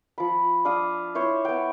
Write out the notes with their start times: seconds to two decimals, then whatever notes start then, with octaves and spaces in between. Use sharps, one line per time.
0.18 F3 B5
0.65 D4 F5 D#6
1.15 E4 C5 C#5
1.45 B3 G5